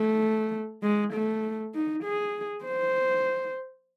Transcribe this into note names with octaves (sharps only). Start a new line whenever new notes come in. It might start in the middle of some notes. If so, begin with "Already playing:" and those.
Already playing: A3
G#3
A3
D#4
G#4
C5